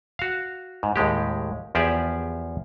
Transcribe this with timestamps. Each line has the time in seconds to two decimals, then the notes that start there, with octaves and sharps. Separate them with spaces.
0.19 F#4 F5
0.83 G#2
0.96 D#2 A2 G#3 G4
1.75 E2 F3 G4 G#4 D5 E5